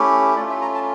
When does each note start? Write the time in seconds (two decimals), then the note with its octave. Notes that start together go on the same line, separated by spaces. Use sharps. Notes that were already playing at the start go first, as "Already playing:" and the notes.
Already playing: A3 C#4 E4 G4
0.36 A3 C#4 F4 D5
0.49 E5
0.61 A#5
0.75 A5